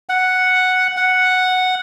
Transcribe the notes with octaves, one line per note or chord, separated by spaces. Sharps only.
F#5
F#5